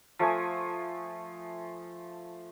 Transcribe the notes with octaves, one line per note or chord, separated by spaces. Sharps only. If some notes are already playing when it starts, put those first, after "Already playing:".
F3 A3 G#5 D#6